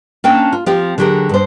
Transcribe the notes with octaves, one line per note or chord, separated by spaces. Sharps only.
A#3 C#4 D4 G5 A5
F4
F3 C4 F4 G4
D3 F#3 G4 G#4 A#4
G2 C5